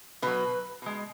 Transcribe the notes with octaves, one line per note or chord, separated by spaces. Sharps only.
B2 F#3 B4
B2 G#3